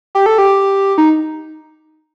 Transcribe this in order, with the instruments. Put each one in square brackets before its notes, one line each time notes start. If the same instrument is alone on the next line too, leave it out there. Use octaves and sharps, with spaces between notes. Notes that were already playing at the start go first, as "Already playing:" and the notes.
[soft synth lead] G4
A4
G4
D#4